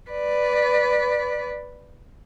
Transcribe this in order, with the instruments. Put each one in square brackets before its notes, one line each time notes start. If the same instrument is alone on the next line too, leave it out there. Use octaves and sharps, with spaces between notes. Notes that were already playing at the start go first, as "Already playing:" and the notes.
[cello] B4 D5